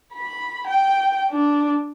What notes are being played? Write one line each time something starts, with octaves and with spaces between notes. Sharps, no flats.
B5
G5
D4